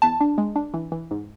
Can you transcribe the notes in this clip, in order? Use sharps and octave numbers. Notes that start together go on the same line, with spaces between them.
E2 A5
D4
G#3
D4
E3
E3
G#2